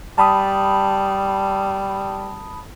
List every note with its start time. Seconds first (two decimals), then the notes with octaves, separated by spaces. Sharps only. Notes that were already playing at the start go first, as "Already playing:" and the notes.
0.18 G3 A5 B5 D#6